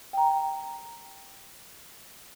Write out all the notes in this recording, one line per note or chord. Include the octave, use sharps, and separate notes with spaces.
G5 A#5